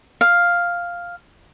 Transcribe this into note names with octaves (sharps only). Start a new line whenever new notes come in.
F5